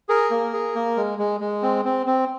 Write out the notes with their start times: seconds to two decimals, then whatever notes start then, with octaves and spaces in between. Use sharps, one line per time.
0.09 G#4 A#4
0.31 A#3
0.53 G#4
0.75 A#3
0.97 G#3
1.19 G#3
1.40 G#3
1.63 C4
1.85 C4
2.06 C4